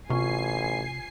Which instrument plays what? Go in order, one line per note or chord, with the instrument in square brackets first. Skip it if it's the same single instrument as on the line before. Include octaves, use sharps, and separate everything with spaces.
[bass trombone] A1 [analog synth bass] C3 [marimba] F4 C#6 [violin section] G#5 C7